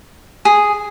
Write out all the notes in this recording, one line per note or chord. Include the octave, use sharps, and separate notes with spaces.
G#4